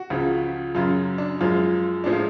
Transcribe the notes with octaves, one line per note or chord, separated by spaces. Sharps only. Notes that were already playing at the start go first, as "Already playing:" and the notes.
Already playing: F#4
C#2 C#3 F3
F#2 C#3 F#3 F4
D4
F#2 F3 G#3 F4
A2 F3 G#3 D4
F4